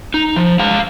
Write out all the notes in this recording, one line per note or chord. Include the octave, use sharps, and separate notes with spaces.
D#4
F3
G#3 F5